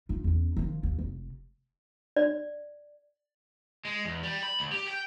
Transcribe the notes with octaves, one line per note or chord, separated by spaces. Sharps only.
D#4 F4
E2 C#4
D#3 F3
D#2
F1
D5
G#3
E2
G3
B5
D2
G4
G5